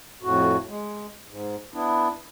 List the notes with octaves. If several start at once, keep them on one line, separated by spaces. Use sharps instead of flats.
F2 A2 F#4
G#3
G#2
B3 D4 E4